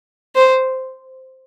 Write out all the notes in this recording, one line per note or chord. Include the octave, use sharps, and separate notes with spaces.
C5